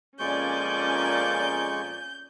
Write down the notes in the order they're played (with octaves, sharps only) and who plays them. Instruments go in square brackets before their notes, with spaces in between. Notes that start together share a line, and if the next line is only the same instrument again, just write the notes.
[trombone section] F2 A#2 [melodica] G#3 C#6 [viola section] C#4 D5 G#5 [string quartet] G6